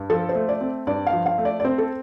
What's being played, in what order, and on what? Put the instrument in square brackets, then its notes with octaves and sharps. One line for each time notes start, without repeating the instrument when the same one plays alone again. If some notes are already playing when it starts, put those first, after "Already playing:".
Already playing: [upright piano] G2
[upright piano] F3 [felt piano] A4
[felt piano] C5
[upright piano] A3
[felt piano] D5
[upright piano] C4
[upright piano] G2 [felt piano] D5
[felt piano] F5
[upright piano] F3
[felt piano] F5
[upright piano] A3
[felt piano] D5
D5
[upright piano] C4 [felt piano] C5
[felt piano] A4